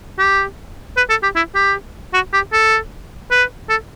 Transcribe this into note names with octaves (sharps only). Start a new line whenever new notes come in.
G4
B4
A4
G4
E4
G4
F#4
G4
A4
B4
A4